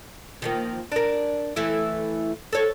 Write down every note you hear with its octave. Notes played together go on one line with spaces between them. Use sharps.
D#3 F3 A#3
D4 A#4
E3 A3 E4
A4 C#5